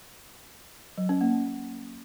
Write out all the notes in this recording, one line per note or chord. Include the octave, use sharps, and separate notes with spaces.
F#3
C#4
A#3